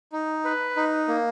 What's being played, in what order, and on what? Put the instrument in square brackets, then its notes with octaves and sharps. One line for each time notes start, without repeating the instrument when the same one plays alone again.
[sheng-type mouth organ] D#4
B4
D#4
A#3